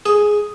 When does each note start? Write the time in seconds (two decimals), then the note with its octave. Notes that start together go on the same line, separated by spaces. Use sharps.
0.06 G#4